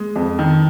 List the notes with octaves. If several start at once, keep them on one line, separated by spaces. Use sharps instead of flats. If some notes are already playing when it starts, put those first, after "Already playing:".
Already playing: G#3
F2
D#3